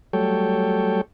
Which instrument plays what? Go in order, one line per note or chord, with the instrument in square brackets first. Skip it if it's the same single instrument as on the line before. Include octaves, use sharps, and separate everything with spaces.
[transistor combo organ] F#3 G3 A3 A4 C#5 G5